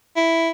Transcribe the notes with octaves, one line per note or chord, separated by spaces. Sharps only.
E4